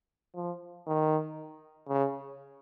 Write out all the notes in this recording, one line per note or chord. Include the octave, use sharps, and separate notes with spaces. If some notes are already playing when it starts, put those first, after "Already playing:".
F3
D#3
C#3